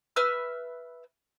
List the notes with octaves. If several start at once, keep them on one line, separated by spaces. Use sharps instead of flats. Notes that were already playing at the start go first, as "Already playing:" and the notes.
B4 E5 E6 F6